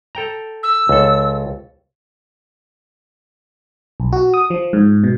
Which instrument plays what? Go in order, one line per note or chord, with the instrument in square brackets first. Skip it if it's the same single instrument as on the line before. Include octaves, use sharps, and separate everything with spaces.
[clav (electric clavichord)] A4 G5 A#5
[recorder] E6
[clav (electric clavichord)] C#2 A4
[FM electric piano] B1
F#4
D#6
F3
G#2
B2